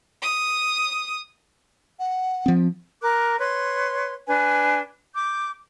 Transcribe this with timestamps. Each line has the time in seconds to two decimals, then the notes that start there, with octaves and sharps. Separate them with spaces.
0.23 D#6
1.99 F#5
2.46 F3 C4
3.02 A#4 D6 F#6
3.39 B4 C#5 C6
4.27 D4 B4 G#5
5.14 D6 G6